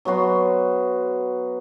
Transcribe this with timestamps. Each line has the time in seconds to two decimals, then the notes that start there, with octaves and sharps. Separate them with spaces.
0.05 F#3 B3 F#4 C6